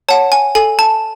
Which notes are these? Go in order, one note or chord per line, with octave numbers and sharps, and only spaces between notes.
C#5 F#5 A5
G#5
A4 G#5
A5